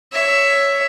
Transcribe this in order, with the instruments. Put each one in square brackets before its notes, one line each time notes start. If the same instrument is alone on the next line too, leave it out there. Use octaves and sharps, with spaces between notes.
[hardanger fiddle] C#5 E5